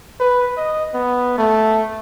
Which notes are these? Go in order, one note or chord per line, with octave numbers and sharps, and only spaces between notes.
B4
D#5
B3
A3